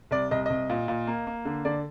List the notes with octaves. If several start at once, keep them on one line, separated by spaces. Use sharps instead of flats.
C2 D5
C2 D#5
C2 D#5
A#2
A#2
A#3
A#3
D3
D3 D5